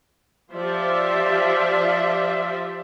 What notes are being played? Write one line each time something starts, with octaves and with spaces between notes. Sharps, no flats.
F3 G4 C5 D5 E5